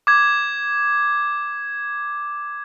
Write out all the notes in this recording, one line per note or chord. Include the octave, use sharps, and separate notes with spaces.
D6 G#6